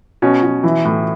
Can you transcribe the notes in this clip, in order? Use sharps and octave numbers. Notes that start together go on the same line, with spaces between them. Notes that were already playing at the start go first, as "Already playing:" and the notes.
B2 C#4
B2
E3 E4
A2